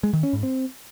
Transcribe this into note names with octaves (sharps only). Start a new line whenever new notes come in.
G#3
D#3
C#4
G#2
C4